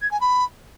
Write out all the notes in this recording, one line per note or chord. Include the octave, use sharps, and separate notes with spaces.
G#6
G#5
B5